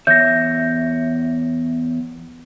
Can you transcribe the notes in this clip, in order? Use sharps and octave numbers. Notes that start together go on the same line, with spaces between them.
E2 C#5 E5 G6 A#6